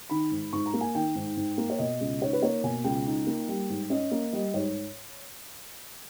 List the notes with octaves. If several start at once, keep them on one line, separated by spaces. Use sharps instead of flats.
D#3 B5
G#2
G#2 C#6
A#5
A#3
G#5
D#3 G5
G#2
G#2
A#3
C#5
B2 D#5
C#2
D#4 C#5
B4
A#3 C#5
B2 G#5
C#2 G5
D#4
A#3
G3
G#2
C#4 D#5
A#3
G3 D#5
G#2 C#5